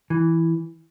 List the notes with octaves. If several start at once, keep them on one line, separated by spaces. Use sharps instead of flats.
E3